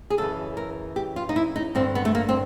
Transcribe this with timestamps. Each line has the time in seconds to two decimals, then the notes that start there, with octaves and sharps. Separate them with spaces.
0.10 G#4
0.18 F#2 C#3 E3 A4
0.57 A#4
0.96 G4
1.16 F4
1.29 D#4
1.36 E4
1.56 D#4
1.75 G2 D3 C4
1.95 B3
2.05 A3
2.15 A#3
2.29 C4